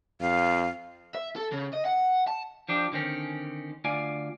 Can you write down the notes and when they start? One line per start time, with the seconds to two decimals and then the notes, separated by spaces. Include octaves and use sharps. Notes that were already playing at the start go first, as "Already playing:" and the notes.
0.21 F2 F5
1.15 E5
1.36 A4
1.52 C#3
1.74 D#5
1.86 F#5
2.27 A5
2.69 F3 D4 G4
2.92 D3 D#3 C4 C#4
3.84 D2 F4 D5 G#5